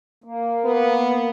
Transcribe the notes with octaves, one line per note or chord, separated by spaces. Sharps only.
A#3
B3